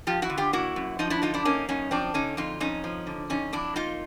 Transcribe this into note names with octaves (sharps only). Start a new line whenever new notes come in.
F3 F4 G4
E4 F#4
D3
F4 G4
A#3 E4 F#4
F#2
F3 D#4 F4
D4 E4
D3 D#4 F4
D4 E4
A#3 C#4 D#4
F#2 C#4 D#4
F3 C4 D4
D3 C#4 D#4
F2 D#4 F4
F2 C#4 D#4
F3
D3
F2 C#4 D#4
F2 D4 E4
A#3 D#4 F4